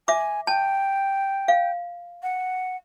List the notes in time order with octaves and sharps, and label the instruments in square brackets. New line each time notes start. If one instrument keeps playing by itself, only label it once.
[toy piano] E5 D6 [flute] G#5
[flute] G5 [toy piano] A5
[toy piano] F5
[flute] F#5